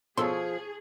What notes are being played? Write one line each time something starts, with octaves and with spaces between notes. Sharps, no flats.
B2 F3 G#4 A4 C#5 C6 E6